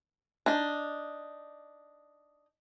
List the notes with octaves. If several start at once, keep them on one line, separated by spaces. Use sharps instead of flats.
D4 D#4